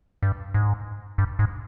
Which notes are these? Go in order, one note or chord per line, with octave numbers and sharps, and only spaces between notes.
G2
G#2
G2
G#2